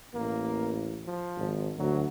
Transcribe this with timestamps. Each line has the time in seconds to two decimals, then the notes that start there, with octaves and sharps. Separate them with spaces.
0.14 A1 A#3
1.06 F3
1.37 G#1
1.78 D2 F#3